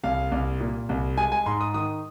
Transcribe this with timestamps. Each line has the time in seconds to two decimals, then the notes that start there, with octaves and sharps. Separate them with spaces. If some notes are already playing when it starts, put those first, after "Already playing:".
0.04 C2 F5
0.32 C2
0.60 A#2
0.89 C2
1.17 G#3 G#5
1.32 G#5
1.46 G#2 C6
1.61 D#6
1.74 D#3 D#6